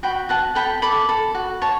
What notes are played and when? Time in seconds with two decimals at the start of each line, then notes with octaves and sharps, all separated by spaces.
0.03 F#4 G5 B5
0.29 F#4 F#5 A5
0.55 A4 G5 B5
0.82 A4 B5 D6
1.09 A4
1.34 F#4
1.62 C#5 A5 C#6